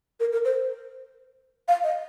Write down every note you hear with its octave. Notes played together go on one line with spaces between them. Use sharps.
A#4
A#4
C5
F5
D#5